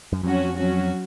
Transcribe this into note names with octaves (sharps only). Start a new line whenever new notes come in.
F#2
F2 F#3 C#4 F#4
F#3 C#4 F#4